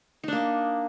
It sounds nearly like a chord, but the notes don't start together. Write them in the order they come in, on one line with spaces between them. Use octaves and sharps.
D#4 D4 A#3